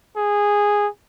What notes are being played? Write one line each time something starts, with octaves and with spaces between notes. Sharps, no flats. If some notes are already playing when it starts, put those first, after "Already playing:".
G#4